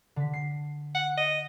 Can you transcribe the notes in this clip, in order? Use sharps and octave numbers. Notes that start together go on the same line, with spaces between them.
D3 B6
C7
F#5
D#5